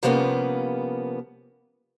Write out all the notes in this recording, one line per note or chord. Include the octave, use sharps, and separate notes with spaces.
C3 F3 G3 A#3 B3 C#4